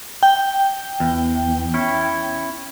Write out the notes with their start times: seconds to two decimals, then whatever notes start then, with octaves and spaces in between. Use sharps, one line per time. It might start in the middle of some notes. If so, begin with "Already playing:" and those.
0.23 G5
1.00 E2
1.74 C#4 E4